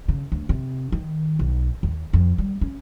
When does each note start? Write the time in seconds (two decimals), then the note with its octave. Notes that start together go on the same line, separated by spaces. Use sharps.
0.08 C#3
0.32 D2
0.49 C3
0.92 D#3
1.39 B1
1.83 D#2
2.13 F2
2.38 G3
2.61 C#4